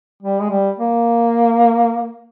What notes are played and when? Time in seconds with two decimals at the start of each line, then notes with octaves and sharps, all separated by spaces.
0.23 G3
0.41 G#3
0.50 G3
0.79 A#3